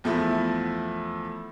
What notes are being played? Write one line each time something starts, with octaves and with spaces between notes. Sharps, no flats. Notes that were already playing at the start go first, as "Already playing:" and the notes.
E2 F3 A3 E4